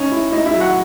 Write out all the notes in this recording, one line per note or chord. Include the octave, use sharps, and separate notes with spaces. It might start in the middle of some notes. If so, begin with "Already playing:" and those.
Already playing: C#4 D#4
E4
D#4 E4 D#5
E4 E5
F#3
F#4 F#5